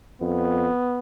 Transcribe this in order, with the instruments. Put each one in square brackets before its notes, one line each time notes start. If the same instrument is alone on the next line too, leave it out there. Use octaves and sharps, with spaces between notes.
[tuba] F2 [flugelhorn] B3